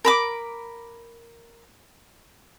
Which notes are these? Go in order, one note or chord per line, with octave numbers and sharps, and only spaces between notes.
A#4 B5 D6